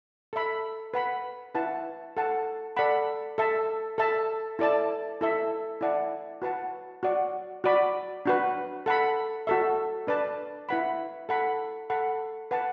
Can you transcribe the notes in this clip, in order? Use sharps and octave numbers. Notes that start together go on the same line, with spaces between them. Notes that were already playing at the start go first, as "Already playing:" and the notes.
A4 E5 B5
B4 F#5 B5
E4 B4 F#5 A5
A4 F#5 A5
A4 D5 F#5 B5
A4 E5 A5
A4 E5 A5
E4 A4 D5 A5
E4 A4 E5
E4 D5 F#5 A5
F#4 B4 F#5 A5
F#4 D5 F#5
F#4 D5 B5
D4 F#4 B4
A4 F#5 B5
F#4 A4 E5
D4 B4 D5 A5
E4 B4 F#5 B5
A4 F#5 B5
A4 F#5 B5
B4 F#5 A5